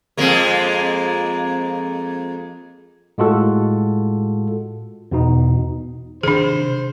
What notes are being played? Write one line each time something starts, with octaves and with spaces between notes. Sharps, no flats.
F2 G#3 A#3
A2 G#3 F4 F#4 A4
E2 B2 D#4
C3 D#3 D4 G#4 C5